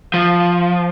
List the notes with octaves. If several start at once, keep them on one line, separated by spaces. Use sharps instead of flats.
F3